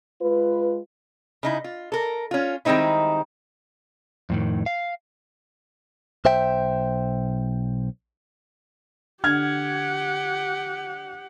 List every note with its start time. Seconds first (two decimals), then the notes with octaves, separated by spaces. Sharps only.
0.22 G#3 F4 B4
1.43 C#3 D#4 E4
1.64 F4
1.92 A4 A#4
2.31 C#4 F4
2.65 D#3 G3 G#3 C4 D#4 E4
4.30 F2 A2 D#3
4.66 F5
6.25 B1 C5 E5 G5
9.24 D3 G4 F#5 F6 G#6